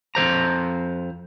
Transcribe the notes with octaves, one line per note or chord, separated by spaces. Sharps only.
F2 E3 C5 A#5